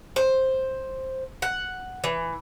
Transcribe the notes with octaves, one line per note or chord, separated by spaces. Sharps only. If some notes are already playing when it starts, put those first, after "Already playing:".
C5
F#5
E3